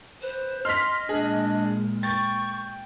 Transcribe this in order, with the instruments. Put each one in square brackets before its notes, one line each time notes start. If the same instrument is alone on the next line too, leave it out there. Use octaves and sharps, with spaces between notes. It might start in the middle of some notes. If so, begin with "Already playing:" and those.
[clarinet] B4 [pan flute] C5
[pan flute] D#5 [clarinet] C6 [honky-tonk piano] F6 B6
[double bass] A#2 G#3 [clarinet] D4 [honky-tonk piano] G#4
[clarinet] G5 [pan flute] C#6 [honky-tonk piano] A6